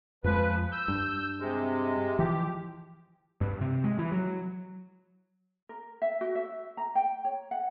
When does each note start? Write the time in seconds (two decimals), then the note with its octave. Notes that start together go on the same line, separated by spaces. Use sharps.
0.24 F2 F3 G#3 B4
0.72 E6 G6
0.88 G2
1.40 C3 G#3
2.19 E3 F3 G4
3.41 G2
3.61 C3
3.84 G#3
3.99 E3
4.12 F#3
5.69 A#4
6.02 E5
6.21 F#4
6.35 E5
6.77 A#5
6.95 G5
7.25 C#5
7.51 F#5